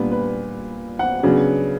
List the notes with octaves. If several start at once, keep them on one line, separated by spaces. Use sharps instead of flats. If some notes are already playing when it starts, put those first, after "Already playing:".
Already playing: A#2 G3 B3 D4 B4
B4
F#5
C#3 F#3 B3 D4